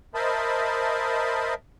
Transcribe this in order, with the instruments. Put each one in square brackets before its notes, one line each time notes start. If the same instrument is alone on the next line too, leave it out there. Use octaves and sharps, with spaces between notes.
[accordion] A#4 C5 D#5 E5 A5 B5